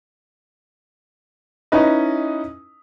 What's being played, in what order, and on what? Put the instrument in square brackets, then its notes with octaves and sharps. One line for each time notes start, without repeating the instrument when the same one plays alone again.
[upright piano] C#4 D#4 E4 B4 D#5